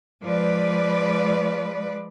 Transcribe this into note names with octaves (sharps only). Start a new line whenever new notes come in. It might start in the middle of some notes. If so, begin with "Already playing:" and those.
F3 G#3 B4 D5